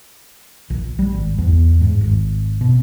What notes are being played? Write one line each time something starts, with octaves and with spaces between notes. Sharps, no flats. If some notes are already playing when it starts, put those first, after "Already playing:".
A#1
G3
G#1
E2
G#2
G#1
B2